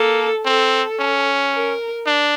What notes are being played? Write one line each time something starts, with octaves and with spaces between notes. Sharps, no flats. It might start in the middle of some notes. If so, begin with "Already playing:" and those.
Already playing: A#3 A4
C4 A4
C#4
A#4
D4